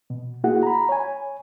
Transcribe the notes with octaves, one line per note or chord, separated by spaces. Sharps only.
B2
A#3 E4 F#4 G#4 F#5
A#5 B5
C#5 G#5